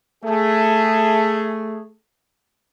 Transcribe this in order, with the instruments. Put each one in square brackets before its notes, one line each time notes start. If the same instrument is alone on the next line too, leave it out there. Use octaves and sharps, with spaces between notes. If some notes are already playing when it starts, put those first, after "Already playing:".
[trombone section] A3 G#4